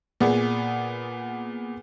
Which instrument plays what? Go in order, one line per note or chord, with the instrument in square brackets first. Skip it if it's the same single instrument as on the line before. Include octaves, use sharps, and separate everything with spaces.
[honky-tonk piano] A#2 B3 G#4